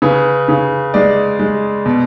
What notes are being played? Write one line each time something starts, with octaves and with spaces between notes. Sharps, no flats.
C#3 B4
C#3
G#3 D5
G#3
B2